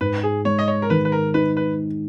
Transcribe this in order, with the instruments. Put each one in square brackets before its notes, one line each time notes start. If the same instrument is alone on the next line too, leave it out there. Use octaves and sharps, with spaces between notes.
[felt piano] G#2 [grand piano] B4
[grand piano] G#4
[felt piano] G#3 [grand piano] C#5
[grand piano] D#5
C#5
A#4
[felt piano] D#3 [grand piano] B4
[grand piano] B4
A#4
[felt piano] D#4 [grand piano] B4
[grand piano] B4